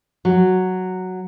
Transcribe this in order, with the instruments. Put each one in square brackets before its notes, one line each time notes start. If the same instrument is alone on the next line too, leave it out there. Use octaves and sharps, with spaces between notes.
[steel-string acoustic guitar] F#3